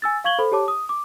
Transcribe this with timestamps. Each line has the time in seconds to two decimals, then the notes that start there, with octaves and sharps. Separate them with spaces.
0.02 G#5 E6 A6
0.24 F5 C#6 G#6 F#7 G7
0.39 A4 C5 B5
0.52 G4 C#5 A5 D6
0.68 D#6
0.89 D6